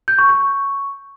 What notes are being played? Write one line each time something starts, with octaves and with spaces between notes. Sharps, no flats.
G6
C#6
C#6